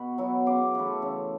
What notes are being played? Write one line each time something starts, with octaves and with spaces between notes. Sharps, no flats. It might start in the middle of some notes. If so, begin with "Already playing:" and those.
Already playing: B2 B5 C#6
F#3 B3 E4
C#3 C6 D6
E3 A3
C#3